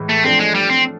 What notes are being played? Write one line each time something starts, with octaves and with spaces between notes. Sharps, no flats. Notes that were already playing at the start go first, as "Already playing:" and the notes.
Already playing: A2 E3 G#3
A3
F3 A3 C4 D4
G#3
G3
C4